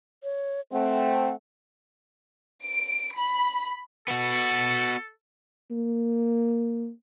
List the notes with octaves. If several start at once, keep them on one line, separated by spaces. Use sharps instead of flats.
C#5
A3 C4 F#5
D7
B5
B3 F#4 A4
A#3